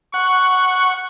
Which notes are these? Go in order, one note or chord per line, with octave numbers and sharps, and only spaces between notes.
F#5 C#6